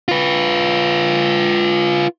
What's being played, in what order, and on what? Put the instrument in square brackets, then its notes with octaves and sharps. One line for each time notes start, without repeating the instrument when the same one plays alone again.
[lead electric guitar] F4 B4